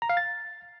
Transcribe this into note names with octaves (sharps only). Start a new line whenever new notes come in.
A#5
F5
A6